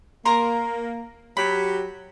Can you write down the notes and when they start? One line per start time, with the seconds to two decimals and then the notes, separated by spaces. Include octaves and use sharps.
0.25 A#3 A#4 A#5 C6
1.37 F#3 G4 B5